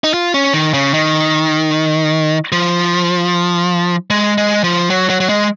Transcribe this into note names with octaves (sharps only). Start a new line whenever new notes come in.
D#4
F4
C#4
D#3
C#3
D#3
F3
G#3
G#3
F3
F#3
F#3
F#3
G#3